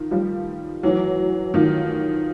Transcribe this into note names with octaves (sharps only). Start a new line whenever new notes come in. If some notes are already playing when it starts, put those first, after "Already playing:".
Already playing: D#3 F3
F3 G3
E3 F#3
D#3 F3